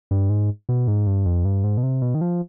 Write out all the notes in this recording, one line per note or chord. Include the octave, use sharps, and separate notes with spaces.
G2
G#2
B2
G#2
G2
F2
G2
G#2
B2
C3
B2
D#3
F3